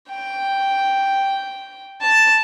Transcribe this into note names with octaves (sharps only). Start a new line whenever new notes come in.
G5
A5